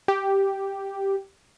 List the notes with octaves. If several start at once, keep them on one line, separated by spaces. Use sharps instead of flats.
G4